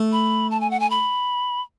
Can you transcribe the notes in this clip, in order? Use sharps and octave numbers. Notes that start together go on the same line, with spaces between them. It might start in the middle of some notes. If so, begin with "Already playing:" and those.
Already playing: A3
B5
A5
G#5
F#5
G#5
B5